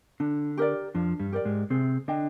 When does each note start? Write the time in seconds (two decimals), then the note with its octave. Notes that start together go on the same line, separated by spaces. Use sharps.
0.20 D3 D4
0.58 G4 A#4 D5
0.95 F2 F3 D4
1.20 G2 G3
1.32 G4 A#4 D5
1.45 G#2 G#3
1.70 C3 C4 G#4
2.08 D3 D4 D#5 G5